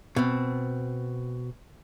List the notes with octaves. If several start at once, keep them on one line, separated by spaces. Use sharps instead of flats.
B2 C4